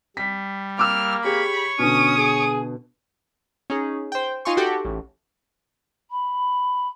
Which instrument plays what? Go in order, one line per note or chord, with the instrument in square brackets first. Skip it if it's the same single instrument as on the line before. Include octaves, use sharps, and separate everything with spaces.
[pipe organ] G3 [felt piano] B6
[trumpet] A#3 [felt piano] D6 E6 [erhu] F6
[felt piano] G4 G#4 [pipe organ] C#5 C#6 [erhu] B5
[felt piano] B2 D3 [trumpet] C#4 [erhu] D#6
[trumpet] G#4
[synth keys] C#4 D#4 G#4
C5 G5
D#4 F4 G#5 C6 C#6
F#4 G4 A4
A1
[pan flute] B5